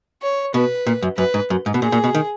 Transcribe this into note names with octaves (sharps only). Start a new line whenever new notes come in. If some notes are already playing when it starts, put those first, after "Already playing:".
C#5
B2 B4
A#2
F#2
F#2 B4
G#2
F#2
G#2
B2
A#2 G#4
A#2
B2
D#3